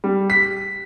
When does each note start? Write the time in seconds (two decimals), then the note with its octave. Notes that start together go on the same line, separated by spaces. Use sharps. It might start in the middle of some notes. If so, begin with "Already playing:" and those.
0.04 G3
0.30 B6